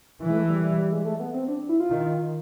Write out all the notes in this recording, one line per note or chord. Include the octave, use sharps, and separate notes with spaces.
E3
G#3
A3
G3
G3
G3
G#3
A3
B3
C4
D4
E4
F4
D#3